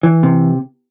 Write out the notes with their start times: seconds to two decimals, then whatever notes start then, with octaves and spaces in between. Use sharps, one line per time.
0.03 E3
0.23 C3